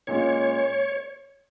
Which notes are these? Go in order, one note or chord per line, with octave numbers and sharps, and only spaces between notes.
A#2 G#3 C#4 F4 C#5